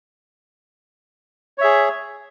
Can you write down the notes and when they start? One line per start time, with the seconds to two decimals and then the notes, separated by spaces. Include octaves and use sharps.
1.58 C#5
1.61 E5
1.64 G#4